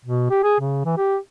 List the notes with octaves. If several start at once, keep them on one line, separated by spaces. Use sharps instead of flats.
B2
G4
G#4
C#3
E3
G4